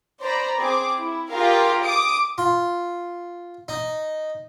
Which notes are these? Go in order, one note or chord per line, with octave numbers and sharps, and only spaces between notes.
C5 D5 A#5 B5
C4 G#4 D6
E4
F4 G4 G#4 A#4 F5
D6 D#6 D7
F4
D#4